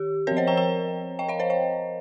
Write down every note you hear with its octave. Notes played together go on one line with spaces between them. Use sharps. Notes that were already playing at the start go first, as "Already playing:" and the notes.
Already playing: D#3 G4
F3 C4 A#4 C#5
C5 D#5
G5 A#5
G5 A#5
D#5 G5
C#5 F5
C5 D#5
D#5 G5